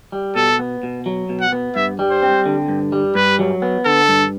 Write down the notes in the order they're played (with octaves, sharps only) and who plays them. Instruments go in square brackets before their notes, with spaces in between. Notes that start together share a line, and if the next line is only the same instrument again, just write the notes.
[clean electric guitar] G3
[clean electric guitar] B2 [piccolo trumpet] A4
[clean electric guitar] B3
B2
F#3
B2
[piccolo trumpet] F#5
[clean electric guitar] B3
[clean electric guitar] G2 [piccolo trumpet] E5
[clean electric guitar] G3
[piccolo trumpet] C5
[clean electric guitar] C4
D3
G2
G3
[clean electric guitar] G2 [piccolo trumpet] B4
[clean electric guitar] F#3
B3
[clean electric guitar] D3 [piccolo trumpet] A4
[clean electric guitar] G2